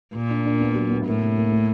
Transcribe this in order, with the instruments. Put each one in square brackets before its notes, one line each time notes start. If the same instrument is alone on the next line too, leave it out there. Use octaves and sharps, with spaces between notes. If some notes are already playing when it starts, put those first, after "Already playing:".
[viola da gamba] A#2 [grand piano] A#3
[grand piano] D4
D4
B3
F#3
B3
[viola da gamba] A2 [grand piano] A#3
[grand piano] C3
A#3
A3